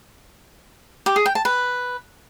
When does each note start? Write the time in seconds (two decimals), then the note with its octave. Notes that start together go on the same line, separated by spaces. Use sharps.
1.06 G4
1.16 G#4
1.26 G5
1.35 A5
1.45 B4